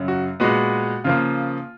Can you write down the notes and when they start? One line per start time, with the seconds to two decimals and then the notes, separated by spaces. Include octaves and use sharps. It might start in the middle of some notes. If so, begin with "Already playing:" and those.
Already playing: F#2 C#3 F#3
0.08 F#4
0.40 A#2 G#3 B3 F#4
1.04 C#3 F3 A#3 F4